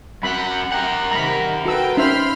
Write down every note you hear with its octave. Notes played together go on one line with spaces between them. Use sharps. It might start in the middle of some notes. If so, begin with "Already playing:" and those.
F#2 F#5 B5
A#4 F#5 G5
C3 D#3 A#5 B5
F#4 A4 B4 G5 E6
C#4 D#4 C5 E5 F5 B5 C6 F6